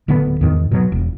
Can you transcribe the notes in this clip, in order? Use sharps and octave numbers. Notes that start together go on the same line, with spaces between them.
D1 D2 D3 B3
E2 G#2 D#3
B2 F#3
E1